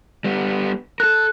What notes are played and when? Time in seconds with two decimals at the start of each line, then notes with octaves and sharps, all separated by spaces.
0.25 G3 B3
1.00 A4 A#4 F#6